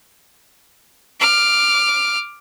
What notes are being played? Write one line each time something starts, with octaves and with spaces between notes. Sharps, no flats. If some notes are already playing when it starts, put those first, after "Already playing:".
D6 F6